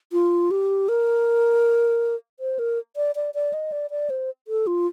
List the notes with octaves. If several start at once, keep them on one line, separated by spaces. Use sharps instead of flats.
F4
G4
A#4
C5
A#4
D5
D5
D5
D#5
D5
D5
C5
A4
F4